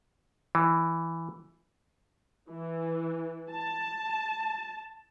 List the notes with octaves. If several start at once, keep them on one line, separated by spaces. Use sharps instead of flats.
E3
E3
A5